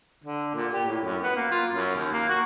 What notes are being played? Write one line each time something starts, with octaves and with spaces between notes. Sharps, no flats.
D3
A#2
G4
A2
F#2
B3
A#3
F4
F#2
D#2
A#3
F#4